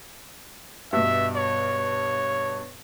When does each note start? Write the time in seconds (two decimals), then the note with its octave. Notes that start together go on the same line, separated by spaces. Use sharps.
0.93 G2 B2 E5
1.36 C#5